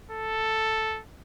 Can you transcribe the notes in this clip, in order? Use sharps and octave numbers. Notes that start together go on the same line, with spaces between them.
A4